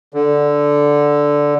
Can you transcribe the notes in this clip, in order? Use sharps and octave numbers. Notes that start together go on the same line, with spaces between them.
D3